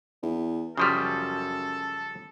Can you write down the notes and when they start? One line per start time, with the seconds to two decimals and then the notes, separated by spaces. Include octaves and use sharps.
0.23 E2
0.78 F#2 C#3 F3 G3 A4